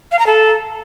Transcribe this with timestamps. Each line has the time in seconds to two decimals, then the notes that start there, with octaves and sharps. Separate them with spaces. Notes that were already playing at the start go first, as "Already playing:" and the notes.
0.12 F5
0.19 A#5
0.27 A4